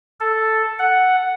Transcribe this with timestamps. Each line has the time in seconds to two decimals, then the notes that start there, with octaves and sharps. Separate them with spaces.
0.20 A4
0.79 F#5